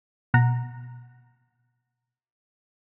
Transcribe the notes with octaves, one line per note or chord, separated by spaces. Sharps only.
B2 F#5 A#5